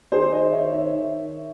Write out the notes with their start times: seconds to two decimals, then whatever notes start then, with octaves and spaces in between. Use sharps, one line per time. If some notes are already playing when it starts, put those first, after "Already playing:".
0.12 D#3 G#4 C5
0.32 C5 D#5
0.52 D#3 C#5 E5
0.72 C#5 E5
0.92 D#3